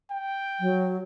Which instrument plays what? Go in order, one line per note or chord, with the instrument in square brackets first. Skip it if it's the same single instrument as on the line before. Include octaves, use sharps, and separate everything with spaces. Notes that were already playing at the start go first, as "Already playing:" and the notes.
[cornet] G5
[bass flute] F#3